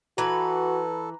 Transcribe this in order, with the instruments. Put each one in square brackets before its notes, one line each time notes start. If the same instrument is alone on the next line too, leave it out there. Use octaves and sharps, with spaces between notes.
[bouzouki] E3 B4 [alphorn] F#4 [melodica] A4 [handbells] A#5